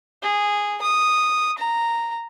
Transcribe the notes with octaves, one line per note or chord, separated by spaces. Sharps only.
G#4
D#6
A#5